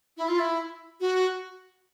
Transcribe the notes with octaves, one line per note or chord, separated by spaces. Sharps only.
E4
F4
E4
F#4